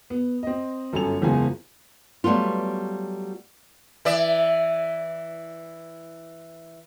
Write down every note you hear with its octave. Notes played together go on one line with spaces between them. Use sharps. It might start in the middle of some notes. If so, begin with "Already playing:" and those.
B3
C4 D#5
G1 F#2 C#4 A4 G#5 F7
F#1 E2 F3 G#3 G#5
F#3 G3 A3 B3 F4
E3 D5 E5